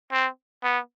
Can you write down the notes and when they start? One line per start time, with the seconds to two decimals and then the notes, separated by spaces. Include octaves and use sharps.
0.12 C4
0.63 B3